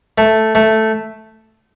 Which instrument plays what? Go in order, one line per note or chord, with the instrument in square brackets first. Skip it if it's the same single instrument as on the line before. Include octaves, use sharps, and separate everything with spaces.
[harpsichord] A3
A3